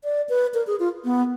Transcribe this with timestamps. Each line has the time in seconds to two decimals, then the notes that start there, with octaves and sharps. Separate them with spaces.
0.04 D5
0.29 B4
0.54 A#4
0.67 G#4
0.80 F4
1.05 B3